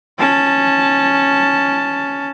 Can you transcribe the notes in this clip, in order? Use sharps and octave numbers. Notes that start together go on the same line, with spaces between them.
C#4 A5